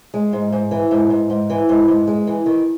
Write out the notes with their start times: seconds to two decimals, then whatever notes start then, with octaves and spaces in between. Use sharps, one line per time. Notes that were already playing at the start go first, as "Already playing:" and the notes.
0.14 G#3
0.33 G#2
0.52 G#2
0.71 E3
0.91 G#2
1.10 G#2
1.30 G#2
1.50 E3
1.69 G#2
1.88 G#2
2.07 G#3
2.27 E3
2.46 D#3